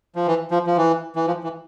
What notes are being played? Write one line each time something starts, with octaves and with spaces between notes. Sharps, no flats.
F3
E3
F3
F3
E3
E3
F3
E3